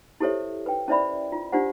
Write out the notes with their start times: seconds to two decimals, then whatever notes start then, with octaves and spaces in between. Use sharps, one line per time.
0.20 E4 G4 A4 C5 C#5 E5
0.66 B4 G5
0.88 C#4 E4 C5 D5 E5 B5
1.32 F4
1.52 D4 F4 G4 C5 F#5